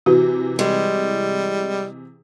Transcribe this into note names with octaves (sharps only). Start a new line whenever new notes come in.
C3 E3 F#4
G3 G#3